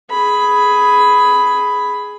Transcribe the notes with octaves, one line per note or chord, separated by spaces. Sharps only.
G#4 B5